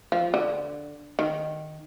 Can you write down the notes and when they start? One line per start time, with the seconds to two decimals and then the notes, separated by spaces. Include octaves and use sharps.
0.12 F3
0.34 D3
1.19 D#3